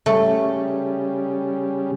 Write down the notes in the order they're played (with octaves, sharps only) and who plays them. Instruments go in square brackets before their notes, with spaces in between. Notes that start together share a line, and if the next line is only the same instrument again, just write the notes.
[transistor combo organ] C#3 G3 [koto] A3